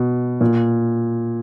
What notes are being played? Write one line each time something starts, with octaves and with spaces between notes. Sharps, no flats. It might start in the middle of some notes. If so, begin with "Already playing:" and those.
Already playing: B2
A#2